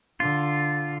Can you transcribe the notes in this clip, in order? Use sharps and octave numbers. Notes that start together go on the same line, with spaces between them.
D3 F4